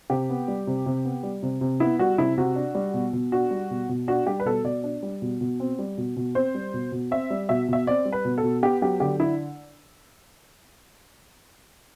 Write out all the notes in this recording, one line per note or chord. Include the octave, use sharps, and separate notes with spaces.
C3 G4
B3
G3
C3
C3
B3
G3
C3
C3
B3 E4
G3 F#4
C3 E4
C3 F#4
D4
G3
B2
B2
D4 F#4
G3
B2
B2
D4 F#4
G3 G4
B4
B2 A4
B2 D5
D4
G3
B2
B2
C4
G3
B2
B2
C4 C5
G3
B2
B2
C4 E5
G3
B2 E5
B2 E5
C4 D5
G3
B4
B2
A4
B2
B3 G4
F#3 G4
D3 G4
D4 E4